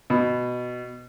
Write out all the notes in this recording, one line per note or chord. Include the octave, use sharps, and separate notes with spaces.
B2